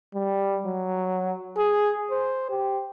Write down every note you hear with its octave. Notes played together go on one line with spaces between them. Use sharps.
G3
F#3
G#4
C5
G4